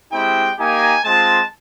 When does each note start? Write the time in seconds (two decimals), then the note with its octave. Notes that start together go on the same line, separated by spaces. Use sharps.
0.13 G#3 C4 E4 G4 G5
0.58 A#3 D#4 G4 G#5
1.04 G#3 C4 F4 A5